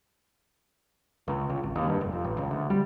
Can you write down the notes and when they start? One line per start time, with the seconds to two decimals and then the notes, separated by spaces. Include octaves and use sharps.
1.28 C#2
1.50 C#2
1.63 G#1
1.76 D#2
1.87 G2
2.01 F1
2.13 F2
2.24 A1
2.38 C#2
2.51 D2
2.70 G3